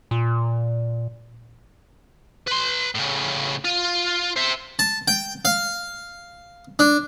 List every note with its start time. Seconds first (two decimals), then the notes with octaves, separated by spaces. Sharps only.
0.11 A#2
2.47 B4 C6
2.95 A2 C#3
3.65 F4
4.36 C5 E5
4.79 A5
5.08 G5
5.45 F5
6.79 D4